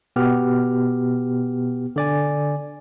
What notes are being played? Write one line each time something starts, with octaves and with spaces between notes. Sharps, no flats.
B2 B3 G4 F6
D3 D5 G#5